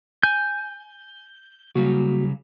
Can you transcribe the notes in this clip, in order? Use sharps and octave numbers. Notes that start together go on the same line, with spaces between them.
G#5 G6
C#3 F#3 G3 A#3 F#4